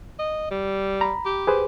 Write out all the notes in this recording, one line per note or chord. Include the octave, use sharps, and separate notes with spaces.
D#5
G3
A#5 B5
G4
G#4 B4 C5